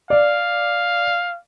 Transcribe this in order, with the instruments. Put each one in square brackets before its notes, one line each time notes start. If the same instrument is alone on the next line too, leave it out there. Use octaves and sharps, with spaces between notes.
[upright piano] D5 [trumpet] F5